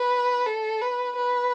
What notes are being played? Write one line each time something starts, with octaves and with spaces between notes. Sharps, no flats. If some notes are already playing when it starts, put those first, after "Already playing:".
Already playing: B4
A4
B4
B4